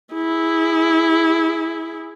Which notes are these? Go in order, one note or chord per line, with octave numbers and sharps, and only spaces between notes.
E4 G#4